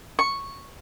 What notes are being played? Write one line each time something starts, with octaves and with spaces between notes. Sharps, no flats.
C#6